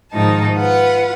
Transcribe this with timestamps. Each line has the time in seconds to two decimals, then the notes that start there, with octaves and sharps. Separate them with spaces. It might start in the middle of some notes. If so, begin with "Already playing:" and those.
0.13 G#2 D#3 F3 D#4 A5
0.55 F4 B4 F#5